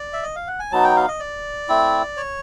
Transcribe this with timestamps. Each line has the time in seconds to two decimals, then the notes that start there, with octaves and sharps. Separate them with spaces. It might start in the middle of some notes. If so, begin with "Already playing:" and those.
Already playing: D5
0.13 E5
0.23 D#5
0.36 F5
0.48 F#5
0.59 G#5
0.72 F#3 B3 D#4 F#4 A5
0.84 G5
0.96 F5
1.08 D#5
1.20 D5
1.69 A3 C4 E4
2.17 C#5